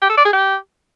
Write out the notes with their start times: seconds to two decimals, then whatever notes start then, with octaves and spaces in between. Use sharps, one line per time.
0.02 G4
0.09 A4
0.17 D5
0.25 G#4
0.33 G4